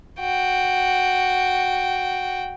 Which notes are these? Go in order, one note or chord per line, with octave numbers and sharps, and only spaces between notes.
F#4 G5